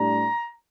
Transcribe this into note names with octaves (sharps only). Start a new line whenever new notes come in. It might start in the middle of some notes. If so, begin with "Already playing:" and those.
Already playing: A2 G3 D4 A#5